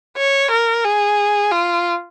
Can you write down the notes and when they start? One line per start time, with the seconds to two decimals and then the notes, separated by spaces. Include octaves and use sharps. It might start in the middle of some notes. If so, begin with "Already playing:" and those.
0.17 C#5
0.51 A#4
0.85 G#4
1.52 F4